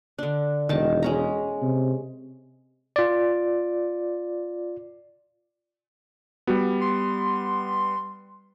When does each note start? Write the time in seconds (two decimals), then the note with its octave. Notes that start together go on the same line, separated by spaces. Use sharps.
0.19 D3 D4
0.69 E1 D#3 A5
1.02 G#3 C#4 A#5
1.62 C3
2.96 F4 D5
6.47 G3 B3 F#4
6.81 C6